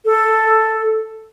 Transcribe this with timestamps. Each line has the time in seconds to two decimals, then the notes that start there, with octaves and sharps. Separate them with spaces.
0.05 A4